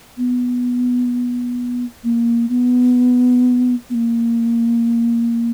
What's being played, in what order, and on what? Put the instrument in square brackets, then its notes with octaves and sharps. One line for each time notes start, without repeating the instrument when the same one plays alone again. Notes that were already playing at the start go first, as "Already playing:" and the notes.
[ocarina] B3
A#3
B3
B3
A#3